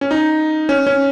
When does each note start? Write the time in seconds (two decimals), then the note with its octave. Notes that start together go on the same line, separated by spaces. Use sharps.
0.01 C#4
0.11 D#4
0.69 C#4
0.87 C#4